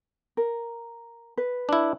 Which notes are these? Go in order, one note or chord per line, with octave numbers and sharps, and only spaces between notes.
A#4
B4
D4 E4